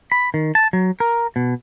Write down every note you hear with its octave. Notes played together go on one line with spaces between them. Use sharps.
B5
D#3
A5
F#3
A#4
B2